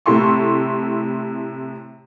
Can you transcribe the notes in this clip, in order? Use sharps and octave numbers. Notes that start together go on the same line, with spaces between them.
A2 C3 E4 A4 C6 C#6